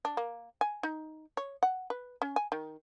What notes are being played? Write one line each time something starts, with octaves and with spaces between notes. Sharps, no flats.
D4
A#3
G#5
D#4
C#5
F#5
B4
C#4
G#5
D#3